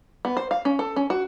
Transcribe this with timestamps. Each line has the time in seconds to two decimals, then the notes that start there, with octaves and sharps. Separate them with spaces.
0.25 B3
0.37 C5
0.51 F5
0.65 C#4
0.79 A4
0.96 C#4
1.10 F#4